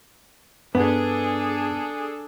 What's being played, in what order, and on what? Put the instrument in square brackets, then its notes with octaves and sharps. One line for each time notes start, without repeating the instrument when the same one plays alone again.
[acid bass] G2 [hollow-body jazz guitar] B3 [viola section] D4 G#4 A4